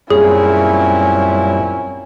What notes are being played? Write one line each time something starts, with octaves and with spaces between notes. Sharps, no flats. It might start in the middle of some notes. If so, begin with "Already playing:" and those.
F#2 A#2 G3 C4 C#4 E4 G#4 C#5